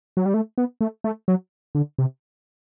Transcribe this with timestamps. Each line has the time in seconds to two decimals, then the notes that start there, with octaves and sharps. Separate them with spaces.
0.17 F#3
0.26 G3
0.34 A3
0.58 B3
0.81 A3
1.04 A3
1.28 F#3
1.75 D3
1.99 C3